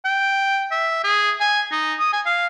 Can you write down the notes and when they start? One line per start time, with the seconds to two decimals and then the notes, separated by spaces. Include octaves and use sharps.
0.05 G5
0.71 E5
1.04 G#4
1.40 G#5
1.71 D#4
1.99 D#6
2.12 G#5
2.25 F5